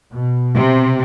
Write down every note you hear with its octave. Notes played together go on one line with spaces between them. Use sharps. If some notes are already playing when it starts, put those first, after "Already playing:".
B2
C3